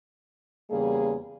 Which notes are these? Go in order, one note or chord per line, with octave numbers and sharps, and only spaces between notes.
E2 C#3 G3 A#3 G#4